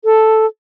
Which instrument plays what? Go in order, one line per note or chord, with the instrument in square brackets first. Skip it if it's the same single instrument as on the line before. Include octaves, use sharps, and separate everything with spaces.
[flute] A4